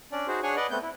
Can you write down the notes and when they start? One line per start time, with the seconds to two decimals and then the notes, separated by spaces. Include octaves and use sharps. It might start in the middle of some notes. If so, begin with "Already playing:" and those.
0.12 C#4 D4 D5
0.28 D#4 F#4 G#4 C5
0.43 D4 G#4 C#5 F#5 G#5 C#6
0.56 B4 D5 D#5 F#5
0.71 A3 B3 C4 G6
0.83 E4